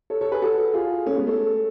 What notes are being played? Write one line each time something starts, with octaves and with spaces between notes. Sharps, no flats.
A4 C#5
A4 C#5
G#4 B4
F#4 A4
F4 G#4
A3 C#4
G#3 B3
A3